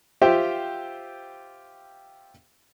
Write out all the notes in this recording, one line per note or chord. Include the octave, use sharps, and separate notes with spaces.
F4 G4 C5 E5 G5